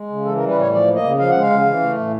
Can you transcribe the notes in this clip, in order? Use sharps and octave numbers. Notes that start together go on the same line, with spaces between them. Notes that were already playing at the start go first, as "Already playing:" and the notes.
Already playing: G#3
C#3
E3 A4
A#4
G3
B4
A2 C#5
F3 D5
A#3
D#5
C#3
F3 F5
G#3 F#5
F5
C#3
E3
A3
A2